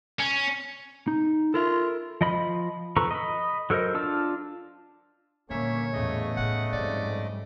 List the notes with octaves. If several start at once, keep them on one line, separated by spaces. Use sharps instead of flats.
C#4
D#4
F4 A4 A#4 E5
F3 D#5 B5
F3 A4 B4 A#5 C#6
D#5 B5
F#3 A4 A#4 C5 D#5
D4 F4 A5 E6 F6
A#2 D3 E3 G3 A#3 C#4 C#5 E5
A1 E2 C#3 A3 D#5
A2 B3 F#5
F2 G#2 G3 B3 D5